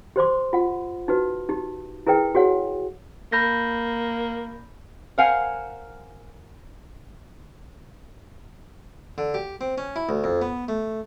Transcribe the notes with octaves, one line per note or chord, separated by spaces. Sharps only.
G4 C5 C6 D6
F4 F#5
D#4 F#4 B4
D#4 G4
E4 G#4 A#4 B4 G5
F#4 G#4 C#5 F#5
A#3 B5 G6 A#6
A#4 C5 F5 F#5 G#5
D3
G4
C4
C#4
E4
D2
F2
B3
A3